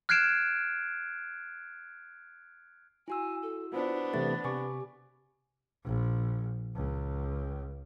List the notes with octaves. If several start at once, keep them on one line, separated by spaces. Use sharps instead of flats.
F6 F#6 G#6 C7 D7 E7
E4 F#4 G#5 E6
A4
B3 D4 F4 C5
C3 E3 A3 A6
C3 G4 G#5 C#6 D6
A#1
C#2